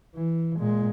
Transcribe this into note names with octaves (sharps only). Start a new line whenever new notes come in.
E3
A#2 G#3